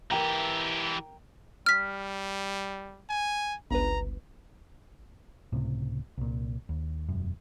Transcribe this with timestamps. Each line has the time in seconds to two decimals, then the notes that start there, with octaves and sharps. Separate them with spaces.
0.11 E3 G4 A#4 G5 A#5
1.66 G3 F6 B6
3.09 G#5
3.71 G1 C#2 B4 A#5
5.52 C#2 A2 C3
6.18 C2 A#2
6.69 D#2
7.09 E1 F#2